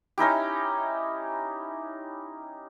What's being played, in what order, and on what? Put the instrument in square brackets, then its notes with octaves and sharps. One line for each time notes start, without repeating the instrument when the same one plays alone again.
[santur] C#4 D#4 E4 G4